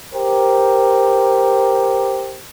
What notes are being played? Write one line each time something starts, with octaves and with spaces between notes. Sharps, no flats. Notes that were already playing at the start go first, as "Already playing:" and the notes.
G4 A#4 C5